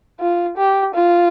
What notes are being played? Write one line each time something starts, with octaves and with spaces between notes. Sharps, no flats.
F4
G4
F4